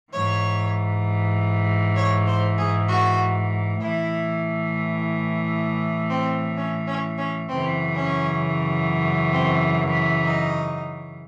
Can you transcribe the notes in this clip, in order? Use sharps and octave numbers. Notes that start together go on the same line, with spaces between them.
G#2 E3 C#5
C#5
C5
G#4
F#4
A2 E3 E4
C4
C#4
C#4
C#4
F#2 C#3 E3 C4
C#4
C4
D#4